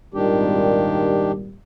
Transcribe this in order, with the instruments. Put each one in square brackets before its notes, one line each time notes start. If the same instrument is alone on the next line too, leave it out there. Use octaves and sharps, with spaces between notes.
[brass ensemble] G#1 A#2 G3 [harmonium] D#3 D4 G4